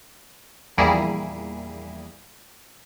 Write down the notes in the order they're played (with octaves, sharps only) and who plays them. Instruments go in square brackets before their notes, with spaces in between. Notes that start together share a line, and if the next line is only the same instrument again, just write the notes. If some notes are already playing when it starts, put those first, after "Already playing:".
[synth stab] A#1 E2 G3 A#3 E4 G#4